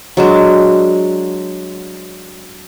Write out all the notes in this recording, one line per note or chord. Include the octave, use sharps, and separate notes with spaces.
F#3 G#3 D4